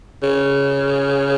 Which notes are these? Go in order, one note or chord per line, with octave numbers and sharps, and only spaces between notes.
C#3